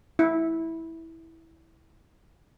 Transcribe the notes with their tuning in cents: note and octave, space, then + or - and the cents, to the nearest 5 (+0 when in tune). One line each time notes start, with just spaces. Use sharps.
E4 -10